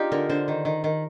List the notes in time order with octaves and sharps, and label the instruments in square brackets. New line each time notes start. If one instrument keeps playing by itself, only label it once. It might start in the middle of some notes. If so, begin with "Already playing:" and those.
Already playing: [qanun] D4 F4 G4 [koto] D#4 G#4
[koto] D3 [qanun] A#4
[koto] D3 [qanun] C5
[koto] D#3
D#3
D#3